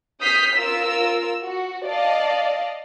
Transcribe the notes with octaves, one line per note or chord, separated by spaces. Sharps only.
D#6 F6 G6 B6 C7
F4 A#4 E6
F#4
D5 D#5 F5 A5